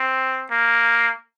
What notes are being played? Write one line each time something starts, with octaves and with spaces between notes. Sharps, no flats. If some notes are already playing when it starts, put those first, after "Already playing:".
Already playing: C4
A#3